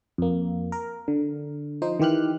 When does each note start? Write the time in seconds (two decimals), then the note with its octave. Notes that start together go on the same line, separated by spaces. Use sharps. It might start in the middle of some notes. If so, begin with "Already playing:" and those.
0.18 F2 A#3
0.72 A#4
1.08 D3
1.82 F3 D#4 C5
1.99 D#3 E3 G4 F6 F#6